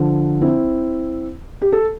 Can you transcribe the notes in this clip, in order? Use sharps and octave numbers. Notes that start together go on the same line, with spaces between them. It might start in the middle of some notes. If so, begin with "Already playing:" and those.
Already playing: D3 F3
C4 E4
G4
A4